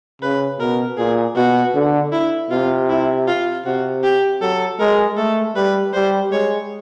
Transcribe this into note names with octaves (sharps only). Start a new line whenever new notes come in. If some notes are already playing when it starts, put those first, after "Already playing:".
C#3 B4
B2 A#4
A#2 G#4
B2 F#4
D3
E4
C3 F4
E4
F4
C3 F#4
G4
F#3 A4
G#3 A#4
A3 A4
G3 B4
G3 C5
G#3 C#5